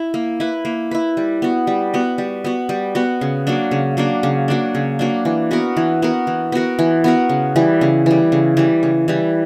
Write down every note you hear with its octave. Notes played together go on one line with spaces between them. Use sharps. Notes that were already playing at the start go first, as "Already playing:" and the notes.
Already playing: E4
A#3
E4 B4
A#3
E4 B4
G3
B3 F#4
G3
B3 F#4
G3
B3 F#4
G3
B3 F#4
C#3
F#3 A#3 D4
C#3
F#3 A#3 D4
C#3
F#3 A#3 D4
C#3
F#3 A#3 D4
E3
B3 F#4 A#4
E3
B3 F#4 A#4
E3
B3 F#4 A#4
E3
B3 F#4 A#4
C#3
E3 G3
C#3
E3 G3
C#3
E3 G3
C#3
E3 G3